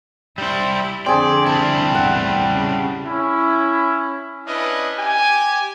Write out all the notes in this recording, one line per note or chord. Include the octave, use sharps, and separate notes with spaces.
G3 E4 C5
F2 D3 C4 G#4 D5
G3 E4 A5
E2 A2 F#5
C#3
C#4 E4
C#4 D4 E4 B4 D#5
G4 G#5